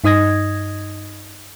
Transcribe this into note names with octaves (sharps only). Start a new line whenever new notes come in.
G2 D#4 D#5 D#6 G#6 A#6